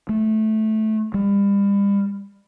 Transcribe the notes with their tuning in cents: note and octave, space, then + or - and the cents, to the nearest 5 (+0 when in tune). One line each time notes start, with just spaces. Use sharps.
A3 -15
G3 +35